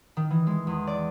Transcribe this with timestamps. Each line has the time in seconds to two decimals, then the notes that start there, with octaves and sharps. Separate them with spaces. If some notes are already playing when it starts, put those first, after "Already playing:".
0.17 D#3
0.31 E3
0.47 G#3
0.67 E2
0.87 D5